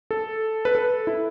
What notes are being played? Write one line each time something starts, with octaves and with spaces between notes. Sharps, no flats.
A4
B4
A4
E4